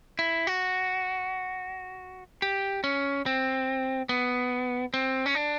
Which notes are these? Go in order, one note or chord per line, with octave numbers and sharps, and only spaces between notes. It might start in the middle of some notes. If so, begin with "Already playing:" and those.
E4
F#4
G4
C#4
C4
B3
C4
C#4
D4